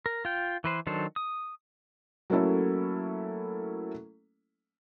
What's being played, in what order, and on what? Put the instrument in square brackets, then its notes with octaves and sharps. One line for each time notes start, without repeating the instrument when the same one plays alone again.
[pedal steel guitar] A#4
F4 G5
E3 B4 C5
D#3 F#3 D4 A4 C5
D#6
[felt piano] F#3 A3 A#3 C#4 E4 A4